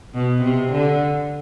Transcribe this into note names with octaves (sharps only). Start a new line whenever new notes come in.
B2
C3
D3